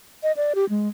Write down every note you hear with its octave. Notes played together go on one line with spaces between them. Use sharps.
D#5
D5
G4
G#3